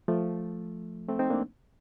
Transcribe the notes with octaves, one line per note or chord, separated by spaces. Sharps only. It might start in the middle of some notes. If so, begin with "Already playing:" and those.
F3 A3
A3 C4
C4 D#4
A#3 D4